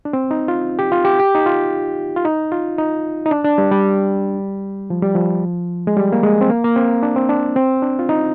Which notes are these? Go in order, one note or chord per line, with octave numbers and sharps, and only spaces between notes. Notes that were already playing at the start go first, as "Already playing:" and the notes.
D4
C4
D#4
F4
G4
F4
G4
G4
D#4
F4
F4
D#4
F4
D#4
D#4
D4
D4
G3
G3
F3
G3
F3
G#3
G3
A#3
G#3
C4
A#3
A#3
C4
D4
C4
D4
C4
D4
F4
D#4